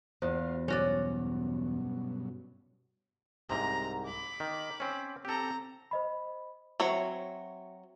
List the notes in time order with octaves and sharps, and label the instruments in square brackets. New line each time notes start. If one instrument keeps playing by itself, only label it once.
[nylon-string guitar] E2 [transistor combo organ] F4 F#4 F5 [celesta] C5
[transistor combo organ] G2 B2 F#3 [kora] C#4 F#4 D5
[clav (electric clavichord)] C2 G#2 C3 [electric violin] A#5
[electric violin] B5 D6
[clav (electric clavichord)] D#3
C4 C#4
[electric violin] C4 A#5 [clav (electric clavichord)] G4 A4
[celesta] C5 D#5 B5
[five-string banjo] F#3 C4 C#5 [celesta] F#4 E5